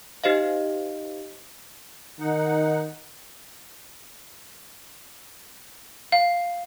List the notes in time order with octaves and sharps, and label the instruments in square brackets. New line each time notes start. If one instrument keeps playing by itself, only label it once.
[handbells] D#4 G4 C5 D#5 F5
[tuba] D#3 [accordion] D#4 F#5
[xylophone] F5